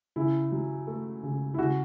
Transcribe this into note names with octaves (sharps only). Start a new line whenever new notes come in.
C#3 E4
F#3
A3
C#3
E4
C#3 F#4